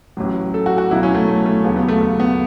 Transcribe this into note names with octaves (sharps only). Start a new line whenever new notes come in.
A1 A2 F#3
A4
F#4
F#4
C#2 B2 F#3 E4
C#4
A3
A3
A3
D#2 C#3 F#3 B3
B3
A3
A3
B3